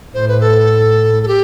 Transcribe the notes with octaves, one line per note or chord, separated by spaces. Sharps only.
A2 C5
B4
A4
A4
G4